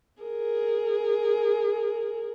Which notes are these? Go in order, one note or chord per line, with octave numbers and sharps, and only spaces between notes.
G#4 A#4